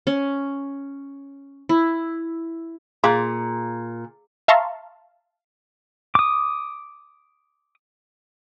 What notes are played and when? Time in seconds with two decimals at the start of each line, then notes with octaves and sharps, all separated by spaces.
0.07 C#4
1.69 E4
3.04 A#2 G#4 F5 C6
4.48 E5 F5 A5 A#5 C6 C#6
6.15 D6 D#6